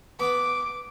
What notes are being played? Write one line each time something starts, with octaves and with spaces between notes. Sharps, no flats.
B3 D6